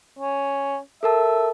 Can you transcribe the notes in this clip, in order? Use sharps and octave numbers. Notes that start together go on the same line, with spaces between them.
C#4
A4 A#4 E5 A5